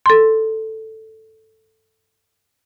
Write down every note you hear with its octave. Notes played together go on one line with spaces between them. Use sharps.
A4 C6